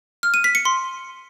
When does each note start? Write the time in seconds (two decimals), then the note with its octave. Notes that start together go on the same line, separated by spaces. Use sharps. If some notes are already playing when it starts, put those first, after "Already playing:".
0.23 F6
0.34 D#7
0.44 B6
0.55 C#7
0.65 C6